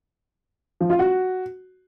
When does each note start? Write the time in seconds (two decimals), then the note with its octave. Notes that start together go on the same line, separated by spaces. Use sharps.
0.81 F3
0.90 F4
0.99 F#4